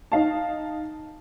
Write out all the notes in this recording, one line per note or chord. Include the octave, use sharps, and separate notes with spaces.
D#4 F5 A5